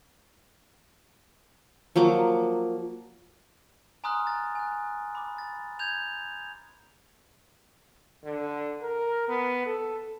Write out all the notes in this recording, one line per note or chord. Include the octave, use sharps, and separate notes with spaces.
F3 F#3 A#3 D6
G#5 A#5 C6 D#6 F6 F#6
A6
G#5 F#6
B5 D6
A6
G6 G#6 F7
D3
A#4
B3
A4